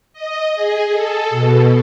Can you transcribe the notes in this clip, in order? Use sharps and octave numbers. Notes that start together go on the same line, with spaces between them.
D#5
G#4
A4
B2